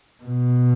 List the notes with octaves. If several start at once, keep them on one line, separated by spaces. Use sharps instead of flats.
B2